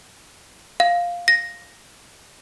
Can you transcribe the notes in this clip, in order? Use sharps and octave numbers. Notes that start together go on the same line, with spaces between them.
F5
A#6